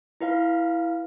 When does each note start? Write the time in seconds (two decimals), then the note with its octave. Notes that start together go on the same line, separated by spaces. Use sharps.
0.21 E4 B4 F5